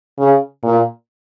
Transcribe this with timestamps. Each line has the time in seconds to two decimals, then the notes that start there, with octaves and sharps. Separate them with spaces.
0.18 C#3
0.63 A#2